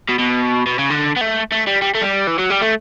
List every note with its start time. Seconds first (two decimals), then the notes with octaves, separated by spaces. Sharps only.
0.09 B2
0.19 B2
0.67 B2
0.79 C#3
0.90 D3
1.16 B3
1.21 A3
1.52 A3
1.67 G3
1.82 G3
1.95 A3
2.01 G3
2.27 E3
2.39 F#3
2.50 G3
2.62 A3